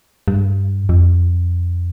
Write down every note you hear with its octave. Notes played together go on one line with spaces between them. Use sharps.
G2
F2